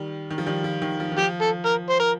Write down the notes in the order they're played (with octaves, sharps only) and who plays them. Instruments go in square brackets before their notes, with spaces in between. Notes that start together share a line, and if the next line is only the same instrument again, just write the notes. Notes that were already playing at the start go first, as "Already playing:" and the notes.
Already playing: [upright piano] D#3 G3
D#3
F3
D#3 G3
F3
D#3
F3
D#3
[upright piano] F3 [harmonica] G4
[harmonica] A4
A#4
C5
A#4